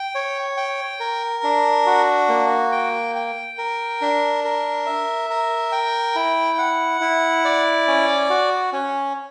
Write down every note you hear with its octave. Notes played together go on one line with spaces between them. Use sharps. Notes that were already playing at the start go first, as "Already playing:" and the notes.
Already playing: G5
C#5
G5
A#4
D4
F#4
A#3
G5
G5
A#4
D4
A#4
E5
A#4
G5
E4
F#5
E4
D5
C#4
F#4
C#4